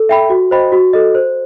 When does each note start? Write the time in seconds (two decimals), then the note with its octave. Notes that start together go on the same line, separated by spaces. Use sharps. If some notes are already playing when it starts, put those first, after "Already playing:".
Already playing: A4
0.09 E5 G5 B5
0.30 F#4
0.51 C5 D#5 G5 B5
0.72 F#4
0.93 A4 D#5
1.15 C5